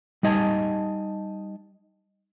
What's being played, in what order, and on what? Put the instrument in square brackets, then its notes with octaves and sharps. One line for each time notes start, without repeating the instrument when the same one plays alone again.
[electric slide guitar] G3 D#4 D#5 G#5 A5